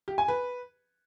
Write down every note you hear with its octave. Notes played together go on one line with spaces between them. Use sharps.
G4
G#5
B4